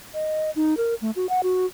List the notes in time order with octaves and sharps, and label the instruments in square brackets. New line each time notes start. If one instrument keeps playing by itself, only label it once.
[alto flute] D#5
D#4
A#4
A3
F#4
F#5
F#4